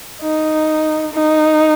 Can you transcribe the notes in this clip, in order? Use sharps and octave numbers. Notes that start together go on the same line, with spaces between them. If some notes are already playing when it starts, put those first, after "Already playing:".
D#4
D#4